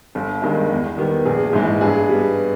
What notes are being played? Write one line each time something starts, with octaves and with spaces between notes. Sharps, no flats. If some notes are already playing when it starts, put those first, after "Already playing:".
G1
G2 D#3 G#3
E2
D#3 G3 B3
A#1 G#4
G#2 E3 G#3 B3
G2 G#4
G3 B3